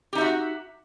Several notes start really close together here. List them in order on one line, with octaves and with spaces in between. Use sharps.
G4 D#4 E5 F#4